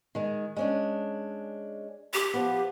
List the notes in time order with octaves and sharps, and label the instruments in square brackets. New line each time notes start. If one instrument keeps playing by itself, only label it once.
[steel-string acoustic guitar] D#3 G#3
G#3 C#4 D4
[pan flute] G4
[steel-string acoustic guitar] F3 B3